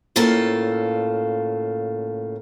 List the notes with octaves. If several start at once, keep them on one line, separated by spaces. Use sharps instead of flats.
A2 C#3 A#3 F4 A4 C5